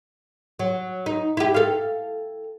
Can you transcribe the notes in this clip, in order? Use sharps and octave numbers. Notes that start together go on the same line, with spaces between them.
F#3
D#4
E4 G4
A4 F5